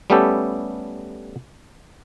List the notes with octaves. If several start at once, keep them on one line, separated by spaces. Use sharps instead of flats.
G3 A3 B3 C#4 G4 A4